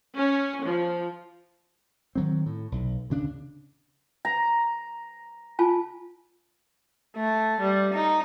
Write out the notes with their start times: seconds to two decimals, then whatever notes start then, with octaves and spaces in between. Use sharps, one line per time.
0.17 C#4
0.64 F3
2.15 D#3 F#3 C4
2.46 A2
2.72 B1
3.10 D2 C#3 D4
4.25 A#5
5.59 F4 G#5 A5
7.16 A3
7.60 G3
7.93 D#4